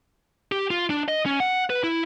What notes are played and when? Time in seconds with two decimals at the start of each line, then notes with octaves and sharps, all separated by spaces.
0.52 G4
0.70 F4
0.90 D4
1.08 D#5
1.26 C#4
1.40 F#5
1.70 B4
1.83 E4